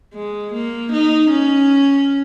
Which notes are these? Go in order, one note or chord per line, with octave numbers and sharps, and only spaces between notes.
G#3
A#3
D#4
C#4